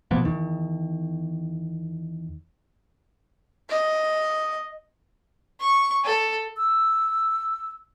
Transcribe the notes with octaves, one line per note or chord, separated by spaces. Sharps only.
B2 F3 A#3 B3
E2 D#3
D#5
C#6
A4
E6